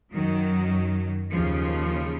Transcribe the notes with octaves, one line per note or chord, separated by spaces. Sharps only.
F#2 D#3 F#3
D#2 C#3 F3